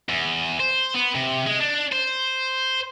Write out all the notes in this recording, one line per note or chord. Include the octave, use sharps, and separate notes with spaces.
E2
C5
B3
C3
G#3
D4
C5